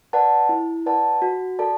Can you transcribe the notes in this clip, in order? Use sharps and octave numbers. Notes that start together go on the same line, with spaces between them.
B4 D5 F#5 A5
E4
B4 D5 F#5 A5
F#4
A4 D5 A5